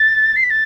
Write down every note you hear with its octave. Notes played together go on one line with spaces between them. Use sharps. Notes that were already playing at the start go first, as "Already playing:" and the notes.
Already playing: A6
C7
B6
A6